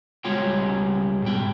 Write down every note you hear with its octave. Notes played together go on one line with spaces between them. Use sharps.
C#2 G3 G#3 F4 C#5 G5
G#2 B2 G5